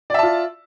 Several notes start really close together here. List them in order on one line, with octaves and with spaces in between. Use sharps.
D5 E5 A5 F4